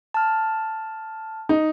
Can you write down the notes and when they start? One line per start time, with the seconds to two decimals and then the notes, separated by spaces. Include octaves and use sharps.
0.14 A5 F6
1.49 D#4